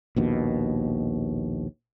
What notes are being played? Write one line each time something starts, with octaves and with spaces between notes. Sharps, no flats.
A#1 D#2 B2